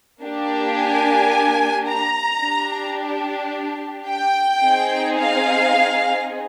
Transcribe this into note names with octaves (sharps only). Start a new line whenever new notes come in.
A#3 D4 G4
G#5
A#5
D4 G4
G5
C4 D#4 G#4
F5